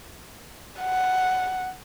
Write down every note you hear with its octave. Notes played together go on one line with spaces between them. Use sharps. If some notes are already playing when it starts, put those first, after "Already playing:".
F#5